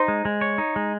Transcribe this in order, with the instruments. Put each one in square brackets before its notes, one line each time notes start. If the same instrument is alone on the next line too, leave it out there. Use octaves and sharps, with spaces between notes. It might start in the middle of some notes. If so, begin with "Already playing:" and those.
Already playing: [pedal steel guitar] D#4 [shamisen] C5
[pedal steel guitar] G#3
G#3
C#5
D#4
G#3